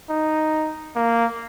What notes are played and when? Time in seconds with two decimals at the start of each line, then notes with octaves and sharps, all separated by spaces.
0.09 D#4
0.95 A#3